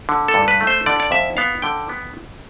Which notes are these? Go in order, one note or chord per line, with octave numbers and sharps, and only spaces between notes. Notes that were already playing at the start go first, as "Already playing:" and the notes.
D3
A4
G2
B4
A3
C5
D3 D5
D5
F2 E5
B3 F5
D3 G5
B3